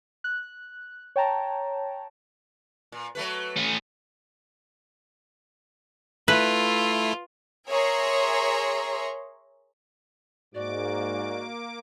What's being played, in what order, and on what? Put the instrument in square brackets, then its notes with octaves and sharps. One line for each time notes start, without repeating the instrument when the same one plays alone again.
[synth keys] F#6
C#5 G5 A5 A#5
[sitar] A#2
F#3 A3 B4
[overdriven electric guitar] A3 C#4
[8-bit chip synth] A3 E4 [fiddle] F4 [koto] B4
[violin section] G#4 A#4 C#5 E5 A#5 C6
[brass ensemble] G#2 [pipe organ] A#3 D6 [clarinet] F#4 [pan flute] D5